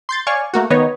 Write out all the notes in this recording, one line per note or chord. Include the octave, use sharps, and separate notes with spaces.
C6 G6 A6
C#5 D5 F5 G#5 C#6
A3 A#3 F#4
D#3 B3 D#4 B4 C#5 D#5